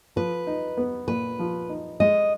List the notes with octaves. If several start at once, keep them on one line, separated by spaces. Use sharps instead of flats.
F3 B4
D#4
B3
A#2 B4
F3
D#4
G#3 D#5